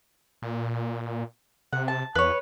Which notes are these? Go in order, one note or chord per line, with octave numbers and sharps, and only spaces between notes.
A#2
C3 F#5
A5
E2 B4 C#5